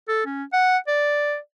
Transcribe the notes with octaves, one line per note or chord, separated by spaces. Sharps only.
A4
C#4
F#5
D5